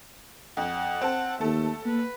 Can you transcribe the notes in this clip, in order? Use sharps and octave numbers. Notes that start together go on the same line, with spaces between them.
F2 F#5
C4 A5
D#2 A3 A4
A#3 B4